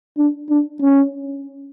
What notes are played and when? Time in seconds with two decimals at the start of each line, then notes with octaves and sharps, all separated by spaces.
0.18 D4
0.50 D4
0.82 C#4